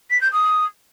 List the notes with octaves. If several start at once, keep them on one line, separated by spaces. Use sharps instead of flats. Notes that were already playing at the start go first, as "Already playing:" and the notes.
B6
G6
D#6